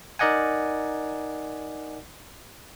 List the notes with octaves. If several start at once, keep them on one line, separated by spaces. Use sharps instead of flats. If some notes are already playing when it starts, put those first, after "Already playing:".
D#4 A#4 D5 D#5 F#5 G#5